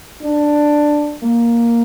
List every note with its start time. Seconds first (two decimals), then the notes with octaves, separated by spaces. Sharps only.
0.22 D4
1.24 A#3